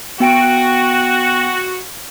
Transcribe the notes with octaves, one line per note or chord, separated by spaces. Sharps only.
B3 F#4 G5 D7